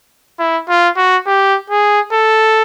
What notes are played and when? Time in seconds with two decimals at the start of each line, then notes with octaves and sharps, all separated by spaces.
0.39 E4
0.69 F4
0.97 F#4
1.27 G4
1.70 G#4
2.13 A4